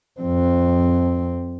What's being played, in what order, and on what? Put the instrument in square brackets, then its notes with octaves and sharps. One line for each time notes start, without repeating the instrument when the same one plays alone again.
[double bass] F2 C4